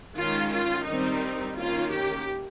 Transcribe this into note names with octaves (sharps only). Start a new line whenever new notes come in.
D#3 G#3 C#4 F4
F4
D#3 G3 C4 D#4
D#3 A#3 C#4 F4
G4